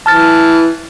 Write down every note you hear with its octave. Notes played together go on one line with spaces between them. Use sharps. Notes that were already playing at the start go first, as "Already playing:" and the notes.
E3 A5 F6 A6